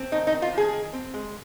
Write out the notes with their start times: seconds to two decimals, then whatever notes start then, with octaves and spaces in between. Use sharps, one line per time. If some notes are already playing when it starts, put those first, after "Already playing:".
Already playing: C4
0.12 D#3 D#4
0.27 D#4
0.32 C4
0.42 F4
0.53 D#3 G#4
0.73 D#3
0.93 C4
1.14 G#3